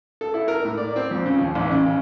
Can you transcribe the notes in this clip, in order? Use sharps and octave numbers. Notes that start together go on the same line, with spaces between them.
A4
E4
A#4
A2
D5
C4
F2
C#3
D#2
A1
C#3
C#3